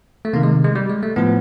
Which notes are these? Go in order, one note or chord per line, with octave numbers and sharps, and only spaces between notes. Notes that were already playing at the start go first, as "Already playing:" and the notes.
A3
C3 D#3 A#3
G#3
G#3
G3
G#3
A3
A2 F3 B3